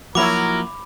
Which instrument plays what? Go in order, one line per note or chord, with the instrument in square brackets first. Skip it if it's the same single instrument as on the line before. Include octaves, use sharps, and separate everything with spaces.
[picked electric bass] F3 A#3 [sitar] F#3 E4 F#4 [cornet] A#4 [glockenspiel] B5 D6